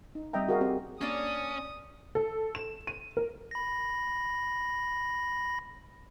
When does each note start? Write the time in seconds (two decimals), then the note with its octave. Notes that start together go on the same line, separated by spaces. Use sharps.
0.15 D#4
0.33 G3 C4 D#5 E5 G5 A#5
0.49 F#4 G#4 A#4 D#5 F5
0.61 C4 G4
1.01 A#3 C#4 D4 D5 D#6
2.15 A4
2.55 E7
2.87 D#7
3.17 A#4
3.51 B5 A#6